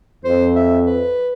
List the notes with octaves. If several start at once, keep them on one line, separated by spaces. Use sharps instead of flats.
F2 C5
E5
B4